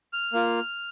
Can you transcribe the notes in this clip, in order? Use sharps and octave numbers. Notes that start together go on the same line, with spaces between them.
F6
A#3 F4